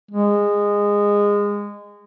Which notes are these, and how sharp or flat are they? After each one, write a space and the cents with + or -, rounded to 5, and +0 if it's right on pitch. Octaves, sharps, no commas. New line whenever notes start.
G#3 -20